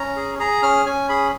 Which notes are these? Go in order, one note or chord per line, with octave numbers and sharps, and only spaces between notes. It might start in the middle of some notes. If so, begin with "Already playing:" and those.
Already playing: C#4 A#5
G#4
G#4 A#5
C#4 F6
C#4 G#5
G#4 B5